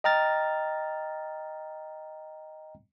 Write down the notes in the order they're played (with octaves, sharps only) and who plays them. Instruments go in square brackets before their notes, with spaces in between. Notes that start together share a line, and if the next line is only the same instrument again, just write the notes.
[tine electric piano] D#5 G5 A#5 F6 A6